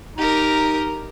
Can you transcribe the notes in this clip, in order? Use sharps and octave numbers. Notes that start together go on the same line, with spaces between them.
D#4 G4 A#4